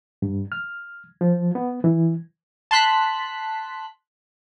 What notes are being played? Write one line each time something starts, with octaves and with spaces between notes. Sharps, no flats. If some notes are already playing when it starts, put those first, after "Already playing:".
G2
F6
F3
B3
E3
A5 C6 F#6 B6